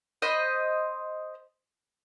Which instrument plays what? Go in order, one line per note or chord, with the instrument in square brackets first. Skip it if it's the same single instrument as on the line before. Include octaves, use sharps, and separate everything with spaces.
[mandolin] C5 D#5 B5